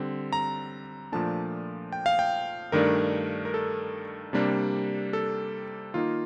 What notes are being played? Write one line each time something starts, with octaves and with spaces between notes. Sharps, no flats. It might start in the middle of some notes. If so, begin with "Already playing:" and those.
Already playing: D3 G3 C4
A#5
A#2 F3 A3 D4 A5
G5
F5
G5
G2 D#3 A3 D4 A#4
A#4
A4
C3 G3 A#3 D4
A4
D#3 A#3 D#4 F4